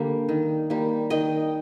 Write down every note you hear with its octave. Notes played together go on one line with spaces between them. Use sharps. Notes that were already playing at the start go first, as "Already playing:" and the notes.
Already playing: D3 G3 A#3
D#3
G3 A#3
D#3 D#5 G5